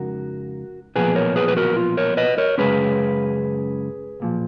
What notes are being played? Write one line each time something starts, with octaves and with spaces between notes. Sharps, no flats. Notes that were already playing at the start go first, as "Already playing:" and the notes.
Already playing: F2 C#3 G#3 D#4 F#4 A#4
B1 A#2 F3 B3 G#4 B4
A#4 C#5
G#4 B4
B4
F#4 A#4
F4
A#4 C#5
B4 D#5
A#4 C#5
F#2 C#3 F3 G#3 C#4 G#4 B4
B1 A#2 F3